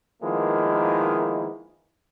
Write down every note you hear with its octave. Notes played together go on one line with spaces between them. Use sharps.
D#3 F3 G#3 A#3 B3 E4